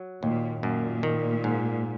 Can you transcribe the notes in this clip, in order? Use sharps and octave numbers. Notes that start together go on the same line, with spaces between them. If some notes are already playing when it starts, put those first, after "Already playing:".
Already playing: F#3
D#2 A#2
F#2 A#2
D#3
G#2